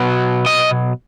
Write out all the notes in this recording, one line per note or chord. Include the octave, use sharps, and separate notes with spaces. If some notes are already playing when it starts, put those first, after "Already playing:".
Already playing: B2 F#3 B3
D#5